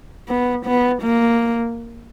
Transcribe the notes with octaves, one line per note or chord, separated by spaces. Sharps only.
B3
B3
A#3